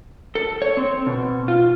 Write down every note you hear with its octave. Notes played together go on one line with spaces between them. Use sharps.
A4
C#5
C4
B2
F4